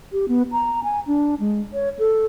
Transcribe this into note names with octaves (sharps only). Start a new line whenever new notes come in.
G4
B3
A#5
G#5
D4
G#3
C#5
A4